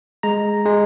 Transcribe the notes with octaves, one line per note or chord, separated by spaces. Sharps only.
G#3 A#5
G#3